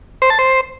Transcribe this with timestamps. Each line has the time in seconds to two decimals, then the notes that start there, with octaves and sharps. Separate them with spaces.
0.22 C5
0.30 A5
0.39 C5